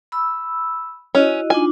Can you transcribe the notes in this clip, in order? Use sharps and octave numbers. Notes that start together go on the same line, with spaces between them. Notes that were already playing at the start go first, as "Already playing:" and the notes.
B5 E6
C#4 E4 F#4 D#5
D4 D#4 F4 G#5